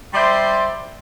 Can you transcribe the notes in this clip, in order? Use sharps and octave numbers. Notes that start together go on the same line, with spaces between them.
G3 C5 D5 E5 C6